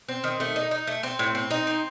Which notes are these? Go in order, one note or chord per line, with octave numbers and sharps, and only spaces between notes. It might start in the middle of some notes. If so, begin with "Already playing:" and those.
C4
D#3
A3
D#4
D#4
A3
C4
A2
C4
D#4
C4